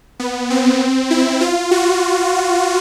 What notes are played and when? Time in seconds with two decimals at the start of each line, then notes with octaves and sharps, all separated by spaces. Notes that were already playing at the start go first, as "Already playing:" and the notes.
0.20 B3
0.50 C4
1.11 E4
1.41 F4
1.71 F#4